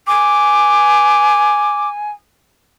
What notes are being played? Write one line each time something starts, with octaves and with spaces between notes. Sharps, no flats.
G#5 D6